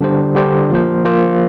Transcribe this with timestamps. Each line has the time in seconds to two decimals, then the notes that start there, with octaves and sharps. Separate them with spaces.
0.01 D3 G3 D4 G4 C5
0.35 D3 G3 D4 G4 C5
0.70 F3 A#3 F4 C5
1.05 F3 A#3 F4 C5